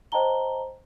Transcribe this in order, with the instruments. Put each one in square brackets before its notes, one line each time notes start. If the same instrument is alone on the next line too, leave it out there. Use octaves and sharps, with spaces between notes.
[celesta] C5 D#5 G5 A5 A#5 G7